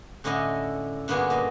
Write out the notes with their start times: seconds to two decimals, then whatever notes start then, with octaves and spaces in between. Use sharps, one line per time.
0.24 A2 D3 C#4 E4 D#5
1.08 G2 D3 A#3 B3 F#4 G#4
1.30 A#2 D#5